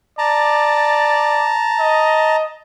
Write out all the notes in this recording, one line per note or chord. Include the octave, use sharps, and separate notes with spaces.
D5 A5 A#5
D#5